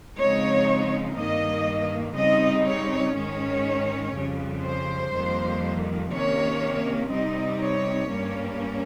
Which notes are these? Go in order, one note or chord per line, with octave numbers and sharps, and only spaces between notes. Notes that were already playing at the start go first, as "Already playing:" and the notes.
C#3 F3 G#3 C4 D#4 C#5
G2 D#3 A#3 D#5
C#3 G3 C4 D#4 D#5
C#5
G#2 D#3 G#3 C#4 C#5
F2 C#3 G3
C5
F2 D#3 G3 A#3
C3 D#3 A#3 C#4 C#5
C3 G3 C4 D#4 D#5
C#5
G2 G3 A#3 C#4